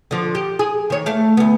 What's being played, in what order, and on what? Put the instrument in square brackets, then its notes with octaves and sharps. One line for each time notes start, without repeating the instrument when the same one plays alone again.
[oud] D3 F3
G4
G#4
D#3 C#5
A3 F5
D2 B3